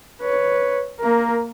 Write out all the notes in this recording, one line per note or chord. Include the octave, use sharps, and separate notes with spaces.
B4 C#5
A#3 A#4